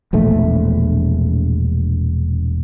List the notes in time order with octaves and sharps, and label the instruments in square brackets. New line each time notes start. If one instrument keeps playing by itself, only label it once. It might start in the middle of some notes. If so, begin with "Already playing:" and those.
[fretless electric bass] E1 A#1 A3